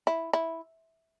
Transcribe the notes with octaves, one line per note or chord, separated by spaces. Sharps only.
E4
E4